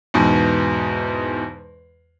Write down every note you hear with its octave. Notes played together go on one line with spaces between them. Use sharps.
E2 G#2 B2